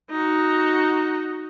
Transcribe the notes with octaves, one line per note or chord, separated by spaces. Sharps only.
D#4 F#4